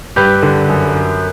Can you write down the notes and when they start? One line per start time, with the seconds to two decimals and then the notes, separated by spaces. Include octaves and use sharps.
0.16 G2 G4 B4
0.43 D3
0.68 F#2
0.94 F#2